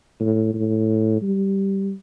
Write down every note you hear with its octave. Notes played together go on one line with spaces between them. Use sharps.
A2
A2
G3